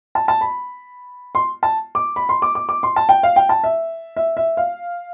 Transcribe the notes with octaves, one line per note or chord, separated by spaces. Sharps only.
A5
A5
B5
C6
A5
D6
B5
C6
D6
D6
D6
C6
A5
G5
F5
G5
A5
E5
E5
E5
F5